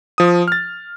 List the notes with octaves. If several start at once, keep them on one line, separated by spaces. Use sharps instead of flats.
F3 D#6
F6 A6